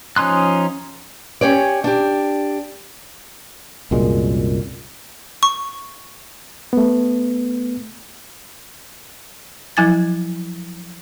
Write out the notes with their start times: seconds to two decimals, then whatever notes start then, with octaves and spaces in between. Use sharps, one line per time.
0.16 F3 C#4 D#4 C6 F#6
1.41 C#4 G4 C#5 D5
1.84 D4 G4
3.91 C2 F#2 A#2 G#3
5.43 C#6
6.73 A3 B3
9.77 F3 F#3 E4 G#5 G#6 A6